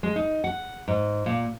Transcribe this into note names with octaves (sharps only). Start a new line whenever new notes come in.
G#3
D#4
F#5
G#2
A#2